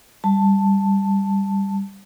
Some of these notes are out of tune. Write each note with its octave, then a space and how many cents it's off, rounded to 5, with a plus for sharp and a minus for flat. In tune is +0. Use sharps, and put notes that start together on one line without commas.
G3 +10 A5 +5